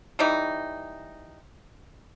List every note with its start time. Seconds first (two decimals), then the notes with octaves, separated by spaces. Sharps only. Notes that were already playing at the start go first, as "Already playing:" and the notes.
0.19 E3 G3 D#4